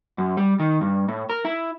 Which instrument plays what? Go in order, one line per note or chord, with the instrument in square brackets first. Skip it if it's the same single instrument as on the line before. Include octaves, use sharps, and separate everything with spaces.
[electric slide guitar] F#2
G3
D#3
G2
A2
A#4
E4